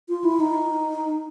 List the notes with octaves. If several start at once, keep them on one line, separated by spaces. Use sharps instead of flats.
F4
E4
D#4